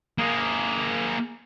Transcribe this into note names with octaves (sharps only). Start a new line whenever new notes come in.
A#3 G#4